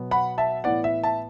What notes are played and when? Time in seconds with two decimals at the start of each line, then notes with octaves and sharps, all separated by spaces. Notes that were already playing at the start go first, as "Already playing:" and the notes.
Already playing: B2 F#3 B3
0.11 F#5 B5
0.38 E5 A5
0.64 A2 E3 B3 D5 F#5
0.84 E5
1.03 E5 A5